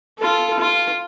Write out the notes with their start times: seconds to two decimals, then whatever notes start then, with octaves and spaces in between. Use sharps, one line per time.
0.19 F4 A4
0.59 F4